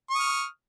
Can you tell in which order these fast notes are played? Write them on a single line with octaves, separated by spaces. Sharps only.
C#6 D#6 F6